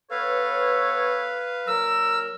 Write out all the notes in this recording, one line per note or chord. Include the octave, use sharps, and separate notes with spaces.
B3 A4 B4 C#5 F5
A#2 F#3 A#4 E6